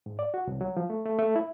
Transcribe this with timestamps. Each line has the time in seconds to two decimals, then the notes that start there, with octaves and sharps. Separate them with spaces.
0.06 G#2
0.19 D5
0.34 F#4
0.47 C2
0.61 F#3
0.77 F3
0.90 A3
1.06 A3
1.19 A3
1.36 E4